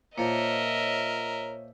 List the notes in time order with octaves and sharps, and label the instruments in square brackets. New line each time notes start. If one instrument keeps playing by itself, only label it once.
[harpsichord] A#2 F3 [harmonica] A#4 [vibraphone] C#5 [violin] D#5 E5